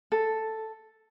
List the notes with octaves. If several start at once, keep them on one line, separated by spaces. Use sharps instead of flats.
A4